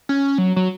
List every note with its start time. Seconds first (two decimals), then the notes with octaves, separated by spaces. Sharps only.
0.09 C#4
0.38 F#3
0.56 F#3